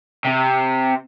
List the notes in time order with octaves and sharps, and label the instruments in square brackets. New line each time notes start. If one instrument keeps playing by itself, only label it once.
[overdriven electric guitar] C3